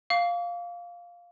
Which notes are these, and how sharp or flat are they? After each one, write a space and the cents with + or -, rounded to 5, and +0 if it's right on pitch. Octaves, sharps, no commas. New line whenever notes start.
F5 +0 D6 -45